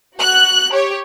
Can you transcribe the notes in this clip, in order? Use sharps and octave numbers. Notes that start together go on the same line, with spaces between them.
F#4 F#6
G4 C#5